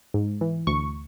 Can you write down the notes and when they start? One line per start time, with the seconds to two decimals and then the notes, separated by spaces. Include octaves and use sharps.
0.14 G#2
0.41 E3
0.67 D2 C#6